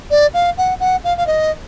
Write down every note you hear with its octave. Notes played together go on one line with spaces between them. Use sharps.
D5
F5
F#5
F#5
F5
F5
D#5